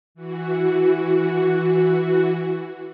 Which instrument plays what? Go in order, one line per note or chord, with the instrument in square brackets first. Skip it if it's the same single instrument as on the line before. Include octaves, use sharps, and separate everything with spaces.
[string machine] E3 F#4